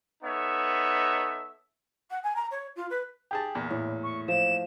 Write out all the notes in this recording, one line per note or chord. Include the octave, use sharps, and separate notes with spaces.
B3 D#4 A4 C#5 E5
F#5
G#5
A#5
C#5
F4
B4
G4 G#4 A5
E2 A#2
A2
C#6
F3 E7